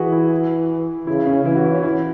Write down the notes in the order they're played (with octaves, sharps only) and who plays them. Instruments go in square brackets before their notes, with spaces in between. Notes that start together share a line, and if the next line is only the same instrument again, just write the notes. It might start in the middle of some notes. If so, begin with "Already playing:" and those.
Already playing: [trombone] E3 [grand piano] F#4 G#4 B4
[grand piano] E4
[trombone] C#3 [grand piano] E4
[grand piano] C#4
[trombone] E3 [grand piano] E4
[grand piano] F#4
E4
C#4
E4